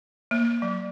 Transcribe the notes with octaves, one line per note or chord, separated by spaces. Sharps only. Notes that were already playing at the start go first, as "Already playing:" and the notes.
A#3
F#3